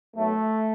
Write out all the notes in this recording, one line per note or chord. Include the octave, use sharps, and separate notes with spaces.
B1 B2 F#3 A3